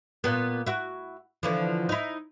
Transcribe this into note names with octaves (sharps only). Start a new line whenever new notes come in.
A#2 B3
E4 F#4
D3 E3 F3
D#4 E4